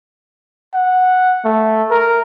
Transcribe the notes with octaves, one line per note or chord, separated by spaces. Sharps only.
F#5
A3
A#4